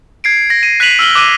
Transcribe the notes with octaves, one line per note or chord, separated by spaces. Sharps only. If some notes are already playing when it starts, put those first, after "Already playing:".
G#6 C7 D7
A#6
D#7
F#6 B6 C7 D#7 F7 F#7
E6 F6 F#7 G7
D6 F#6 D#7